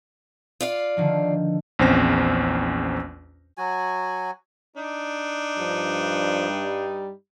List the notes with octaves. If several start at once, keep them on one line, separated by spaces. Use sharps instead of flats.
F4 D5 F5
D3 D#3 F3
A#1 E2 C4 C#4 C5 A#6
F#3 F#4 G#5
D4 D#4
G2 F3
G3